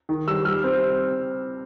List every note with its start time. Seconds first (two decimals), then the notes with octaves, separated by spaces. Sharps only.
0.09 D#3
0.28 G3 E6
0.45 G3 F6
0.64 C4